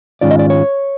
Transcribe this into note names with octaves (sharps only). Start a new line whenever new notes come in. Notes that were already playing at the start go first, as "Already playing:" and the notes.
G#2 D#3 G#3 C#4 F4 D5
D#5
D5
C#5